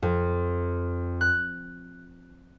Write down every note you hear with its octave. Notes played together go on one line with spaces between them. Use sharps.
F2
F#6